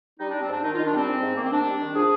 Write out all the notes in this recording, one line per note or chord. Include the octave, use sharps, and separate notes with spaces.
G3 D#4
G3 D4
C4
G#2 D4
D#3 D#4
D#3 F4
D4
G3 C4
G#2
G#2
D#3 A#3
C4
G#2 D4
G3
D#3
F3 G#4